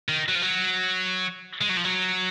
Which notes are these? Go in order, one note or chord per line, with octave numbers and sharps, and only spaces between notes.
D#3
F#3
F3
F#3
G#3
F#3
F3
F#3